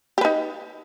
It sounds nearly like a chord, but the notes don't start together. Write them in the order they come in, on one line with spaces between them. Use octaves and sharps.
G4 B4 D#4